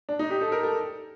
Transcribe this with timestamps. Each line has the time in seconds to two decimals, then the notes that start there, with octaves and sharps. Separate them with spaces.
0.09 D4
0.19 D#4
0.31 G4
0.41 A4
0.52 A#4
0.63 A4